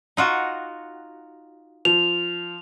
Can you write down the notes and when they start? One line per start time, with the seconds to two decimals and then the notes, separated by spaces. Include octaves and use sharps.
0.17 D#4 F4 F#4
1.85 F3 F7